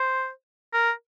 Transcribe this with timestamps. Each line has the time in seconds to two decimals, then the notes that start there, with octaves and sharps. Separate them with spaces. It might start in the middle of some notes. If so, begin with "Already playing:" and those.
Already playing: C5
0.73 A#4